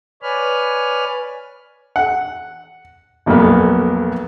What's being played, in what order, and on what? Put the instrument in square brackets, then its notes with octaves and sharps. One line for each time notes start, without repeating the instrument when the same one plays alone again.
[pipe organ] B4 C#5 D5 G#5 B5 F6
[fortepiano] F#5
B1 F2 A#2 F#3 A#3 B3